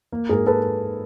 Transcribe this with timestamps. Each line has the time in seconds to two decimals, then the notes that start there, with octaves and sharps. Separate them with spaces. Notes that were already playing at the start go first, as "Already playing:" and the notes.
0.12 A#3
0.29 G#2 G#4 A#4
0.47 A4 B4